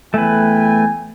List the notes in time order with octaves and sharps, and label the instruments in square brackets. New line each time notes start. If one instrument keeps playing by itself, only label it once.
[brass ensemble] E2 G5 G#5 [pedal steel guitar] A3 B4